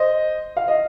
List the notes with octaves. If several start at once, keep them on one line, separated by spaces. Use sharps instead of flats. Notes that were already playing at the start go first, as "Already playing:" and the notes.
Already playing: C5 D#5
F5
D#5